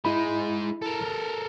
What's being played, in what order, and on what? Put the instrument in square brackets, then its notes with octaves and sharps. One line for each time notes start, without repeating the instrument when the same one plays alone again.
[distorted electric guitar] G#3 D#4 [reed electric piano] E4 B5
[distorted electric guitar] A4 A#4